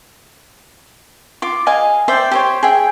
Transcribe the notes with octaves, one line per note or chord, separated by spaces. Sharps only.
F4 D6
G#4 D#5 F5 G#5
C5 D5 E5 G5
G4 C5 C#5
G#4 E5 G5